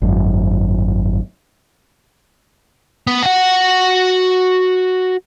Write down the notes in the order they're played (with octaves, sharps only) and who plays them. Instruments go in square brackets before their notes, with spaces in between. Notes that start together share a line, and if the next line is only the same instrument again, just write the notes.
[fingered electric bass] G#1 F#2
[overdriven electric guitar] B3
F#4 F#5